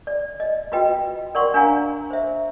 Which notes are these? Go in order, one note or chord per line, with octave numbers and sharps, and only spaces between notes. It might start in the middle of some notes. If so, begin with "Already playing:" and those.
D5
D#5
F4 F#4 B4 D#5 G5
A#4 D5 F#5 C6 C#6
D4 A#4 F5 F#5 G#5 A#5
C5 E5